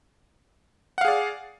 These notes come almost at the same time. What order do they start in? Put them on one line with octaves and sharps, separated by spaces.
F#5 F5 G#4 D5